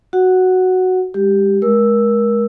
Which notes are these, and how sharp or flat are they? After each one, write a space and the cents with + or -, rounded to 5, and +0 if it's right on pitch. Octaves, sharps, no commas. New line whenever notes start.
F#4 +0 F#5 +0
G#3 -40 G4 +0
G#3 +25 A#4 +25 E6 +0